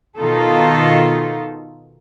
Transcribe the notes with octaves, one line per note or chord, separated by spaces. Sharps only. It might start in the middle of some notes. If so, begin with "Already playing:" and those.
B2 D#3 D#4 F4 A4